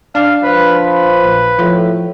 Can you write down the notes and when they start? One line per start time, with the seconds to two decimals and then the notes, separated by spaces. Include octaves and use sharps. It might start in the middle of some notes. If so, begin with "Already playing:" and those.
0.15 D4 F5
0.44 F3 B4
0.86 B4
1.24 A#1
1.59 A2 F3